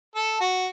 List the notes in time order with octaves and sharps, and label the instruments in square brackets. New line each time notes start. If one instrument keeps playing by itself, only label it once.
[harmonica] A4
F#4